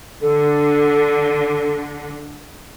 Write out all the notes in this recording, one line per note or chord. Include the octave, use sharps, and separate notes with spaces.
D3 A4